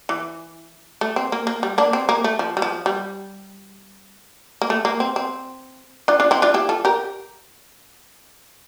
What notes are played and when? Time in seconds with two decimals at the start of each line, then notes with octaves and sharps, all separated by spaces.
0.09 E3
1.01 A3
1.16 C4
1.32 A#3
1.47 A#3
1.63 G3
1.78 A#3 D4
1.93 C4
2.09 A#3
2.24 A3
2.39 F3
2.57 G3
2.62 F3
2.86 G3
4.62 A#3
4.70 A3
4.85 A#3
5.00 C4
5.16 C4
6.08 D4 F4
6.20 D4 F4
6.31 C4 E4
6.42 D4 F4
6.54 E4 G4
6.69 F4 A4
6.85 G4 A#4